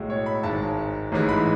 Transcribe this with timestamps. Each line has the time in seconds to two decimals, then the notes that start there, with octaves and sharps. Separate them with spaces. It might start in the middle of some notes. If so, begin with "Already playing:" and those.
Already playing: B1 A2 G#3
0.10 C#5
0.26 B5
0.43 G#1 G#2 G#3 A5
1.12 A1 G#2 E3 G#3
1.29 B5